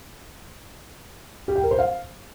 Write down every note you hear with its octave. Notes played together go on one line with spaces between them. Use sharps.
G4
G5
A#4
C5
F5